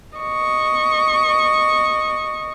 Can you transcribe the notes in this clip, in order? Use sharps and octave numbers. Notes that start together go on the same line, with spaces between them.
D#5 C#6